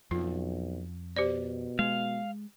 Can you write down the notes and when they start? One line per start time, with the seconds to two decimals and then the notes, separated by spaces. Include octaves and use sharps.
0.11 B1 F2 F4
1.16 B2 G4 C5 D5
1.79 G#3 F5